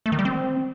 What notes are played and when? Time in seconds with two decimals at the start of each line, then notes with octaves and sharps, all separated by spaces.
0.06 A3
0.12 D#3
0.19 G3
0.25 C4